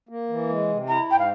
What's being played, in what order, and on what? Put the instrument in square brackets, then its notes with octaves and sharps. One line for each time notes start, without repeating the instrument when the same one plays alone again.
[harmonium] A#3
E3
G#3
C3
[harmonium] E4 [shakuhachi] A#5
[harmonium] G#2 [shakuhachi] G5
[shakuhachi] F5